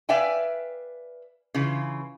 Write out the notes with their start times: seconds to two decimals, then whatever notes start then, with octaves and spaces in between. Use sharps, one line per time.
0.09 B4 D5 E5 F5 G5 G#5
1.54 C#3 E3 F4